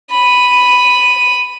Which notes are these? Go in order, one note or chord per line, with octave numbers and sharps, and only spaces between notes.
B5 D#7